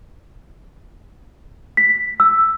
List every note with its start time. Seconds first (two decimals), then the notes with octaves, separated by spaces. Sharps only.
1.77 B6
2.20 E6